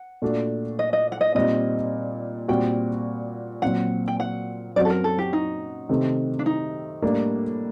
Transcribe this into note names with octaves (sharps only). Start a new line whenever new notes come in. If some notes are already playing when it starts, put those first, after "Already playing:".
Already playing: F#5
A#2 A3 D4 F#4
D#5
D#5
F#5
D#5
A#2 G3 C4 D#4 D#5
A#2 G3 C4 F#4 G5
A#2 F#3 C4 F#5
G5
F#5
F#2 F#3 C4 F#4 D5
A4
A#4
A4
G4
D#4
C3 D#3 A3 C4
D4
D#4
A2 G3 A#3 D4